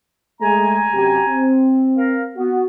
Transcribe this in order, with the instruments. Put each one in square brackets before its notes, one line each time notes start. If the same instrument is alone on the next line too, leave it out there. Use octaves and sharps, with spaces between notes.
[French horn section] G#3 A3 G#4 [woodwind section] G#5 A#5
[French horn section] F#2 C3 G4
C4
[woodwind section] A#4 F5
[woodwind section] B3 [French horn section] F#4